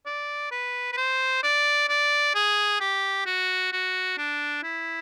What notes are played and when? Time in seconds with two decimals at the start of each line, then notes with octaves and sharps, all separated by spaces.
0.06 D5
0.52 B4
0.92 B4
0.97 C5
1.43 D5
1.89 D5
2.35 G#4
2.80 G4
3.26 F#4
3.72 F#4
4.18 D4
4.64 E4